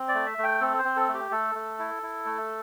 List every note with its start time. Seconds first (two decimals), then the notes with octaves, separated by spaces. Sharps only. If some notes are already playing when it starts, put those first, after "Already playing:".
Already playing: C4
0.08 D5
0.14 A3
0.26 E5
0.38 A3
0.44 G5
0.61 C4 A4
0.78 C5
0.85 C4
0.96 A4
1.09 A3
1.14 G4
1.31 A3 A4
1.55 A3
1.79 E4
2.03 E4
2.25 A3